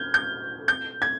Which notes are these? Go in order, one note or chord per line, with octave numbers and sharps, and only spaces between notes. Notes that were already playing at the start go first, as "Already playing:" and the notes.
Already playing: F6 G6 G#6
G6
G6
G#6